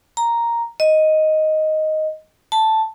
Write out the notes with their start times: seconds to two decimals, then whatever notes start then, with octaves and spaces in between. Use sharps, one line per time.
0.17 A#5
0.80 D#5
2.52 A5